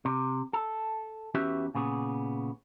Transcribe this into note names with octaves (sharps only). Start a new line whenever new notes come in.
C3
A4
E2 C#4 F#4 G4 B4 E5
A#2 C#3 B3 G#4